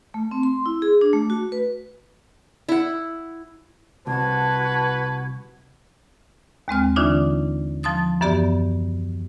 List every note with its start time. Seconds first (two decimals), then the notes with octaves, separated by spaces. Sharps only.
0.14 A3
0.31 C4
0.43 C6
0.66 E4
0.82 G#4
1.01 D4
1.13 A3
1.30 F#4
1.52 B4
2.69 E4 F#5
4.07 C2 F#4 B4 F#5 A5 G#6
6.68 D#2 G#3 C4 F6
6.96 D3 E3 D4 D#4 F4
7.83 F3 A5 C6 D#6 A6
8.21 F#2 E3 B3 G4 D5 A#5